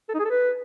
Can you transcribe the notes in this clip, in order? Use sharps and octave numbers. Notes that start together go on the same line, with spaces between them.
A4
D#4
G#4
A4
B4